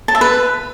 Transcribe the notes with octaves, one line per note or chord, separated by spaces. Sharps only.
A5
E5
B4